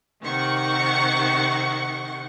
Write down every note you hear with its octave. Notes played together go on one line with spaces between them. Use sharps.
C3 D#3 F#5 C#6